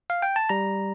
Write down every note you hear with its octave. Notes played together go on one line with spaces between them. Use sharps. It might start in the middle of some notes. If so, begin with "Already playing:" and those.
F5
G5
A5
G3 A#5